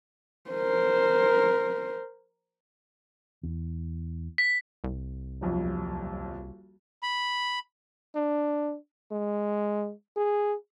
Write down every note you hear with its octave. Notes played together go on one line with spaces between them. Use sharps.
A#4 C5
E2
B6
C2
D#1 B1 F2
B5
D4
G#3
G#4